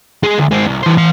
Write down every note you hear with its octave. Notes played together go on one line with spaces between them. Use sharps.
G#3 G#4
D2
G#3 C4
C2
E3 C5
E3 C6